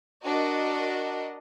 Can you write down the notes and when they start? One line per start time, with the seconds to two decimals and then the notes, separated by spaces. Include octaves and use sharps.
0.23 D4 F#4 A#4 D#5